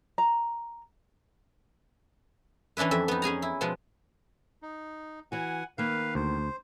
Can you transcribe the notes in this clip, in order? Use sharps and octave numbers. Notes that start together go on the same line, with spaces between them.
A#5
E3 C#4 D4 E4 B4
F2 E5
B3 D#4
C#4 G#4 G#5 A#5
E4
B2 F3 G#3
D#4
E3 F#4 F#5 G#5
D#3 A#3 B4 F5
D2 C5